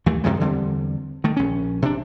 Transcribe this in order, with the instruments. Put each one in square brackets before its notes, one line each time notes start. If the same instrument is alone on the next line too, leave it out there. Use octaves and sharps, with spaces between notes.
[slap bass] D#2 E3 A3
F#2 C3 D#3 G#3
E2 D3 G3 C4
D#3 A3
A#1 C#4
C3 D4